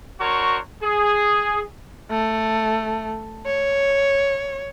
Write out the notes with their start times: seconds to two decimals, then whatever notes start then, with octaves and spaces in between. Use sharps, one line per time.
0.20 D4 F#4 A#4 C5 C#5 C#6
0.83 G#4
2.11 A3
3.46 C#5